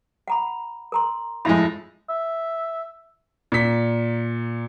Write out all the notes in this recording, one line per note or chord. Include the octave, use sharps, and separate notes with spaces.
F#5 A#5 B5
A#4 A#5 C6
F2 A2 G#3 E5 B5
E5
A#2 B6